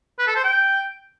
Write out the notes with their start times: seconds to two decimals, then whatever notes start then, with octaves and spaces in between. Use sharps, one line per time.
0.19 B4
0.27 A4
0.36 C5
0.44 G5